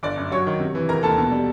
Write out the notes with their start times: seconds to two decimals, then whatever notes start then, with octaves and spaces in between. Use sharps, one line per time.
0.03 G1 D5 D6
0.17 F#2
0.32 F#3 C#5 C#6
0.47 D#3
0.60 C3
0.75 E3
0.89 F1 A#4 A#5
1.03 D#2 A4 A5
1.18 B2
1.31 G3